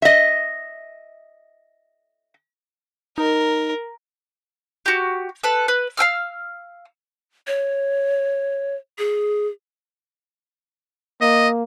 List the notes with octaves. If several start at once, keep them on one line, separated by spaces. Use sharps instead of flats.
D#5 E5
D#4 A#4
F#4 G4
A4 B4
B4
F5 G5 E6 F6
C#5
G#4
A#3 D#5